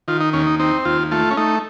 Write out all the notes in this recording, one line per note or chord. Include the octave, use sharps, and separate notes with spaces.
D#3 F4
D#4
D#2 C#4
D#4
C4 D#4
D#2 F4
A3 F4
C#4
A3 D#4